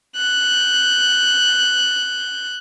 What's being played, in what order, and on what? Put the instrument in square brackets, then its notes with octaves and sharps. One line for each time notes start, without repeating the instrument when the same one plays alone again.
[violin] F#6 G6